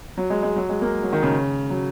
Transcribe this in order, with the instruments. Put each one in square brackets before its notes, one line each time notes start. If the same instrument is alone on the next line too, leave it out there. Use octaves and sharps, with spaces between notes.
[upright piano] F#3
G#3
G#3
F#3
G#3
A#3
F#3
D#3
C#3
F#3